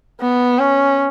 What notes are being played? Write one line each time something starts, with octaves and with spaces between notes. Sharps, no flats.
B3
C#4